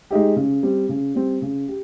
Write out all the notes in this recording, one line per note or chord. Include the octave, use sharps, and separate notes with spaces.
G#3 D#4 G4
C#3
G3 C4
C#3
G3 C4
C#3
G4